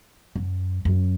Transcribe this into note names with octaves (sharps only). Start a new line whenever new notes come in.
F#2
F#2